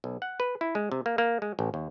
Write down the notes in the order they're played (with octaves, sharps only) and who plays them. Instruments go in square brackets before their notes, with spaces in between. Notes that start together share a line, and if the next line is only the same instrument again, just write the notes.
[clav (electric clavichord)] B1
F#5
B4
E4
G#3
C3
A#3
A#3
G#3
A1
D#2